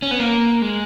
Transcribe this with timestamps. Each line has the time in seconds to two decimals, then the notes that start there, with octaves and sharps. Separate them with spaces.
0.02 C#4
0.11 B3
0.20 A#3
0.62 G#3